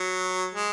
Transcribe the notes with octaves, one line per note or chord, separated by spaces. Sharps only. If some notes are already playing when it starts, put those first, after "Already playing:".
Already playing: F#3
G#3